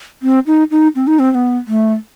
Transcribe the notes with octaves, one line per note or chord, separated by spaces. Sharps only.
C4
D#4
D#4
C4
D#4
C4
C4
B3
A3